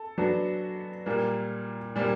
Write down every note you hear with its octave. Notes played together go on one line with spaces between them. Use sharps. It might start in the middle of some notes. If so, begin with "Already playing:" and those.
Already playing: A4
F#3 B3 D4 F#4 A4
A#2 G3 A#3
A#2 G3 A#3